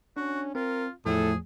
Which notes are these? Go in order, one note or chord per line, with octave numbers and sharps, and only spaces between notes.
C#4 D4 F#4
C4 F4 A#4
E2 A2 F3 A3 G#4 A4